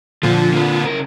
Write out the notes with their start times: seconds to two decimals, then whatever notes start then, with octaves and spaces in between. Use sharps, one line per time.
0.23 A#2 D3 F3 F4
0.54 A#3 B4
0.84 C#3 A#4